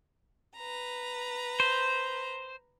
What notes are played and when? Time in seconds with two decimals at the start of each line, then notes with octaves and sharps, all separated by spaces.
0.57 B4 A#5
1.60 C5